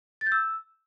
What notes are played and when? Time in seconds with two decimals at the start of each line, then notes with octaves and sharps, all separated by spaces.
0.21 A6
0.26 G6
0.32 E6